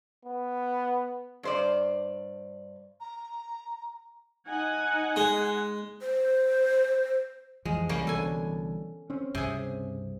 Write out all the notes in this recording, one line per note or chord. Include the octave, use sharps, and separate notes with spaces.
B3
G2 C5 D5
A#5
D#4 F#5 G#5
G#3
C5
F2 E3 F3 G#3
C2 G3 A#3 C#4
C2 B2 D3 A4 G#5
C4 C#4
C#2 G2 C3 G#4